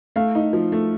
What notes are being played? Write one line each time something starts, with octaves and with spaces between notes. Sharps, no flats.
A3 F5
D#4
F3
A3